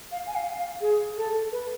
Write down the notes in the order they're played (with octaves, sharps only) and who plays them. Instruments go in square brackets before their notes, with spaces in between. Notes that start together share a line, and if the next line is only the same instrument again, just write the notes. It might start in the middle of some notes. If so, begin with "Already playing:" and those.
[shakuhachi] F5
G#5
F5
F5
G#4
A4
B4